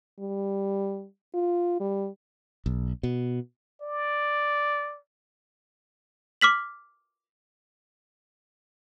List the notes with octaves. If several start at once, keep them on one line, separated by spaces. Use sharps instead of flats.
G3
F4
G3
B1
B2
D5
D6 F6 B6 F#7